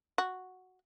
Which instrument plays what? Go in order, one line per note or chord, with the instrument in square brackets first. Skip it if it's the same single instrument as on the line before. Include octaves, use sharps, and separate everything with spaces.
[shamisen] F#4